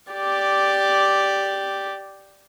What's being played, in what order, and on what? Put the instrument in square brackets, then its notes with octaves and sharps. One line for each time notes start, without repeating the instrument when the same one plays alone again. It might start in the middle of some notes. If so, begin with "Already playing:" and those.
[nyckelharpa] G4 D5